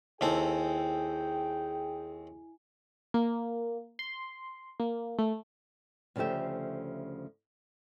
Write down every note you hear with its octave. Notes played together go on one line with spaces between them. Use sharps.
D#2 C4 E4 G#4 A4 G5 G#5
A#3
C6
A#3
A3
D2 C#3 F3 A3 G4 E5